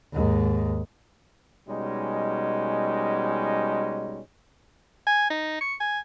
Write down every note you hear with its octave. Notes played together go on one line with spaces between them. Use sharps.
D#2 G#2
B2 G3 G#3 C#4 D#4
G#5
D#4
C#6
G#5